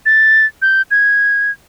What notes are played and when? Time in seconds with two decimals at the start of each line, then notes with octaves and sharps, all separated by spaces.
0.06 A6
0.62 G6
0.91 G#6